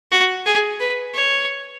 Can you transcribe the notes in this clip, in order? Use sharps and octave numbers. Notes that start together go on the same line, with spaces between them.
F#4
G#4
B4
C#5